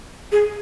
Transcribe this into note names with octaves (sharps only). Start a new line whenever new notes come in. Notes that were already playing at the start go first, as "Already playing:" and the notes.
G#4